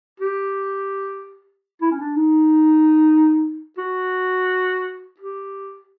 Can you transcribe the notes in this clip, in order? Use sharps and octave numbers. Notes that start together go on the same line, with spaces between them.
G4
E4
C#4
D4
D#4
F#4
G4